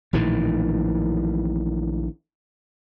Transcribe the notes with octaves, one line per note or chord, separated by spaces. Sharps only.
A#1 A2 D#3 E3